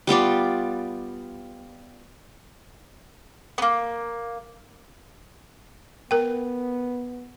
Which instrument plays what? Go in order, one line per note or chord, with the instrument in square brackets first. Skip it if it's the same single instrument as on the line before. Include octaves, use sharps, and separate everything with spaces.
[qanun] G3 B3 F4 D5
[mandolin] A#3 B3
[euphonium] B3 [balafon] A#4 G5